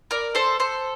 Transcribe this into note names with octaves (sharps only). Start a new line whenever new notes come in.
A#4 D5
A4 C5
A4 C5